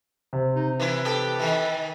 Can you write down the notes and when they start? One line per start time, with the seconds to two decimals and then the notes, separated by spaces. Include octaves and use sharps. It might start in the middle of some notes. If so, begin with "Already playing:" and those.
0.33 C3
0.56 D#4
0.80 E3 E4 B4
1.05 G4 A4
1.39 D#3 E3